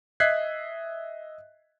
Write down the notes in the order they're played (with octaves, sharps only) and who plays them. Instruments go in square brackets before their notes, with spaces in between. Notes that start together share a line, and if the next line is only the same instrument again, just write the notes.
[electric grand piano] D#5 E5 F#6 G#6 B6 C7